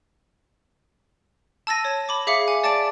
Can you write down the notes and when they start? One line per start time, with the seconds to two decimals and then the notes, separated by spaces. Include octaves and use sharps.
1.67 A5 E6 A6 A#6 D#7
1.85 C#5
2.09 B5 D6
2.27 G#4 E5 F5 D6 C7 C#7
2.48 G#5
2.64 D5 A5 D6 A6 D7